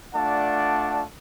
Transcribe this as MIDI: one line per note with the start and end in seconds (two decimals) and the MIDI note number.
0.14 1.04 57
0.14 1.04 62
0.14 1.04 65
0.14 1.04 74
0.14 1.04 78
0.14 1.04 81